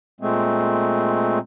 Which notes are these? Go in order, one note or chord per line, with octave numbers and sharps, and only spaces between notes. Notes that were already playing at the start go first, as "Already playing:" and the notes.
A#2 G#3 A3 C4